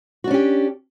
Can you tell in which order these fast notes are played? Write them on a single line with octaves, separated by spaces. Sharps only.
F#4 D4 C#4 G4